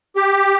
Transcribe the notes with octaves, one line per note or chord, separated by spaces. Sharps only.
G4